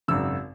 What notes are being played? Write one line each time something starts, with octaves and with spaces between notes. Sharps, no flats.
G#1 F#2 C#3 E6